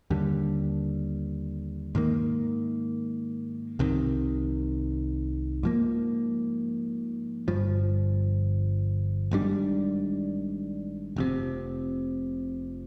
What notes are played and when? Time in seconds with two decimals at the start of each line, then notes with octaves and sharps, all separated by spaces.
0.10 D#2 D3 G3
1.95 G#2 D#3 A#3
3.79 C2 C3 D#3
5.63 G#2 F3 A#3
7.48 G1 G2 F3
9.31 G#1 G#2 G3 D4
11.16 F1 F2 C3